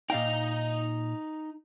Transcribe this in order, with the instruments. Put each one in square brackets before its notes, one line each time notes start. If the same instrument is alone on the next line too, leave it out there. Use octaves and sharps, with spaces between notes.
[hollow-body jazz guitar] A#2 F5 G5 [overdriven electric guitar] D#4 D#5